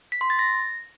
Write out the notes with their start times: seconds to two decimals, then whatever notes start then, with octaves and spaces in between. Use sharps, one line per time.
0.12 B6
0.21 C6
0.30 A6
0.39 A#6